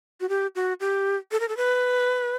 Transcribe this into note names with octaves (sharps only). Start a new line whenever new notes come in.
F#4
G4
F#4
G4
A4
A#4
A4
B4